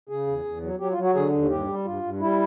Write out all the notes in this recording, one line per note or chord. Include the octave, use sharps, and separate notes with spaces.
C#3 G#4
E2
E2
F#3
F#3 G4
F4
F#3
F#4
D3 G#4
D#2
G2 G4
G3
G2 F4
G2
G3 E4